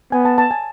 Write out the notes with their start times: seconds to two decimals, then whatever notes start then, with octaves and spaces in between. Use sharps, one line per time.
0.12 B3 G#5
0.25 A5
0.38 A5
0.51 G#5